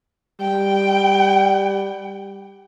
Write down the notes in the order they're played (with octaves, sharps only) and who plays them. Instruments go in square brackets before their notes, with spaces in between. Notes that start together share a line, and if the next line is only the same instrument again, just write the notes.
[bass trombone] G3 [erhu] G5